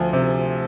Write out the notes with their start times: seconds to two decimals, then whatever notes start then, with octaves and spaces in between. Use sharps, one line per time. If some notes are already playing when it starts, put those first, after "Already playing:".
Already playing: D2 F3
0.13 C3